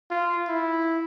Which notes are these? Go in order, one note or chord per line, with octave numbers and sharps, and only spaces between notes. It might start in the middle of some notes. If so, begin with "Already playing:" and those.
F4
E4